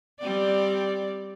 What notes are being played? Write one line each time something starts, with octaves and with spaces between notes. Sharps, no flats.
G3 C4 D5